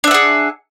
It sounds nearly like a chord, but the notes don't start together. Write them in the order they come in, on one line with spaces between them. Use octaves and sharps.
D4 E5 F#5 G#4